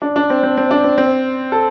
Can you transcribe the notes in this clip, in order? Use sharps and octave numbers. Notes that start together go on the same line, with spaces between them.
D4
D4
C4
C4
C4
D4
C4
C4
A4